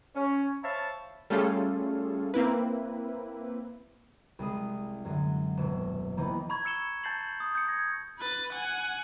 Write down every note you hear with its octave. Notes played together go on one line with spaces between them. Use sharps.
C#4
C5 C#5 E5 F5 A5 B5
G3 A3 C#4 F4 G#4 A4
A#3 C4 E4 B4
C2 G#3 D#6
F#2 D3
D#1 B2 E7
C3 D#3 E3 A#3 B3 D#4
A#5 B5 C#6 G#6
C#6 E6 C#7 E7 G7
A5 G6 A6 C7 F#7
D#6
G6 C#7
G#6 A#6
B4 A6
F#5 G#5